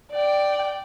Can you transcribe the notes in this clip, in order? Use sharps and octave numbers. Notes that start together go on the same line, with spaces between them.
D5 G5